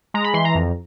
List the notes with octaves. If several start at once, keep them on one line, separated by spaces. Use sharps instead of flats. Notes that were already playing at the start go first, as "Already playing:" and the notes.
G#3 A#5
B5
E3 C6
A#5
F2